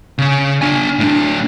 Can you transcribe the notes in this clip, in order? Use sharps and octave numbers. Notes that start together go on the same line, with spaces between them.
C#3 C#4
D4 G#5
A2 D4